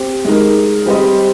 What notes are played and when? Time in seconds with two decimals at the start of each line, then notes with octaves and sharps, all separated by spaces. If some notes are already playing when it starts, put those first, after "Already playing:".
Already playing: C4 G4
0.25 G#3 D#4 A#4
0.86 G3 C4 G4 C5 D#5